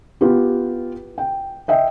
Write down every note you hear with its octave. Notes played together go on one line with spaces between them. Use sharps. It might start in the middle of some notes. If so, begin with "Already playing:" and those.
B3 F4 G4
G5
D#5 E5 G5